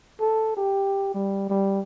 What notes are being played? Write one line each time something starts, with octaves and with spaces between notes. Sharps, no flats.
A4
G4
G3
G3